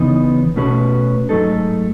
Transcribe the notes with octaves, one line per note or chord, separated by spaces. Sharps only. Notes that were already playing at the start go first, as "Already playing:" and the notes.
Already playing: E2 C#3 E3 B3 D#4
B2 A3 C#4 F#4 B4
G#2 F#3 A3 D#4 A4